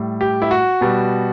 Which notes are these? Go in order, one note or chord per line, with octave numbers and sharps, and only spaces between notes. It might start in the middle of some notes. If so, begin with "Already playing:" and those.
Already playing: A2 G3
G4
E4
F#4
B2 G3